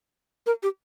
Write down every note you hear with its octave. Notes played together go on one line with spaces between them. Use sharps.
A#4
G4